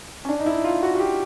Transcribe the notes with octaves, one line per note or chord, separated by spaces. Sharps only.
C#4
D4
D#4
E4
F4
F#4
F#4
G4